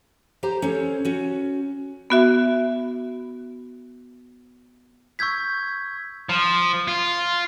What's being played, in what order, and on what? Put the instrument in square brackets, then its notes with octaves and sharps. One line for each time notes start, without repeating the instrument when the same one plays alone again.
[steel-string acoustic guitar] G4 C5 A#5
C#4 A4 C5 C#5
C#4 F#4
[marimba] B3 F#4 E5
[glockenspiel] C#6 E6 G6 G#6 B6
[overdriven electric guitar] F3
F4